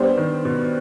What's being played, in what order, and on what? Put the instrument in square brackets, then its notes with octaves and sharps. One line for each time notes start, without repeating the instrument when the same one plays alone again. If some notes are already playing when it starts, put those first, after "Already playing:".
Already playing: [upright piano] G3 [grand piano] B3 D4 G4 C5
[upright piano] D#3
B2